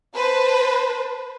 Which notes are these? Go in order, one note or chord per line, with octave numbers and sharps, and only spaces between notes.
B4 C5 A5